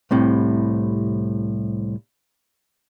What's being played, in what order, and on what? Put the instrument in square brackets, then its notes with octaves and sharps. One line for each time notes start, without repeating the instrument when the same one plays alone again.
[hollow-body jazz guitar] C2 A2 C3